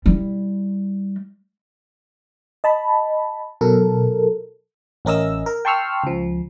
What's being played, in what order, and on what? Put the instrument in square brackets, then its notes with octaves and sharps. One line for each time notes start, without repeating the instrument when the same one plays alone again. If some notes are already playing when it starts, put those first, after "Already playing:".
[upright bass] G3 E4
[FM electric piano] D#5 A5 B5
B2 F#3 A4 A#4
A1 C#4 A#4 D#5 E6
A#4
G5 A5 C6 C#6 E6 F6
C#2 F3